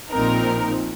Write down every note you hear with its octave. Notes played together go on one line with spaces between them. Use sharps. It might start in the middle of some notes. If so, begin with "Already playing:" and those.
A#1 A#2 F3 C4 D#4 A#4